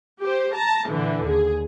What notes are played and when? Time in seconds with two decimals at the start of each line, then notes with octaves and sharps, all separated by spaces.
0.22 G4 C5
0.55 A5 A#5
0.89 A#2 D3 E3
1.26 D#2 G#4